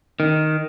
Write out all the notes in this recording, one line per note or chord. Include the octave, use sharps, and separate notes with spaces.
D#3